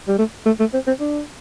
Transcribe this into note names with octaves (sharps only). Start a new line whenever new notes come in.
G3
A3
A3
A3
C4
C4
D4